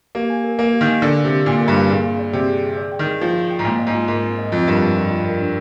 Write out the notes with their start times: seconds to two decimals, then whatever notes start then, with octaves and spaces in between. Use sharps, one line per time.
0.15 A#3 G4
0.30 G#5
0.44 A#4
0.59 A#3 F5
0.73 G4
0.81 D#3
0.88 G#5
1.02 D3 A#4
1.17 F5
1.25 C3
1.32 G4
1.46 A#2 G#5
1.61 A#4
1.68 G2
1.75 F5
1.90 A#2 G#4
2.05 G#4
2.19 D5
2.33 C3 G5
2.48 G#4
2.63 G#4
2.77 D5
2.92 G5
2.99 D#3
3.07 G#4
3.21 F3 G#4
3.36 D5
3.50 G5
3.59 G#2
3.65 A#2 C4
3.79 D#5
3.87 G#2
3.94 F4
4.08 G#2 A#4
4.23 C4
4.38 D#5
4.52 F2 F4
4.67 G2 A#4
4.82 F2 C4
4.96 D#5
5.11 F4
5.26 A#4
5.40 D4